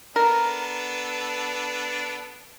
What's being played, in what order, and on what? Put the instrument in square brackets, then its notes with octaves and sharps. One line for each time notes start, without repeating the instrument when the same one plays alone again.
[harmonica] B3 D4 A4 [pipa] A#4